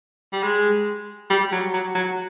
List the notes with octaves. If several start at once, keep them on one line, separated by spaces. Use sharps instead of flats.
G3
G#3
G3
F#3
F#3
F#3